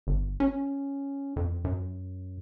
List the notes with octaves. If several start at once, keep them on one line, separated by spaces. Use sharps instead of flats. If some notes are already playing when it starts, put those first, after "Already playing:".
G1
C#4
F2
F#2